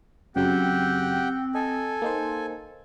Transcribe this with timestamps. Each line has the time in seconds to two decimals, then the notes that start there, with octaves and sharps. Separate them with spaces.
0.36 F#2 C#3 F#3 C4 G4 F#5 G5
1.55 A4 D#5 G#5
2.02 A#3 D#4 C5